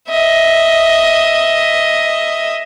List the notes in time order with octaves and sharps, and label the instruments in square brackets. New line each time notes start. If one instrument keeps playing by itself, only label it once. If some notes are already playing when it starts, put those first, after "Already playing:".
[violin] D#5 E5